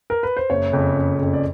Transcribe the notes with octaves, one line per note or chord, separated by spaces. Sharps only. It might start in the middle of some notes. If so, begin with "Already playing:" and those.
A#4
B4
C5
F#1 C#5
F2 C#3
F#1
F2 C#3
D5